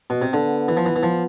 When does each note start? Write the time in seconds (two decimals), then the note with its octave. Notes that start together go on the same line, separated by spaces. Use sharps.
0.10 B2
0.22 C3
0.33 D3 B3
0.68 E3
0.77 F3
0.86 E3
0.96 E3
1.03 F3